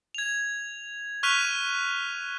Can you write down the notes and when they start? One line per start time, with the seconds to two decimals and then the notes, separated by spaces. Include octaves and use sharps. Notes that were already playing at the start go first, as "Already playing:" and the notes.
0.15 G#6 F7
1.23 C#6 F6 F#6 B6 D#7 F7